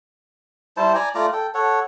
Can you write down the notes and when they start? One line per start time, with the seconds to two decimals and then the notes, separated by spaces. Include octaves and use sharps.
0.77 G3 E4 C5 A5
0.95 D5 G#5 A#5
1.15 A3 F4 D5 A#5
1.33 A4 G5
1.54 A4 C#5 F#5